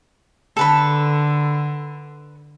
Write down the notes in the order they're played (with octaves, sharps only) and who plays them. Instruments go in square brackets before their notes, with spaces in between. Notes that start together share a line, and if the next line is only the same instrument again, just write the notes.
[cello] D3 [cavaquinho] A4 B4 B5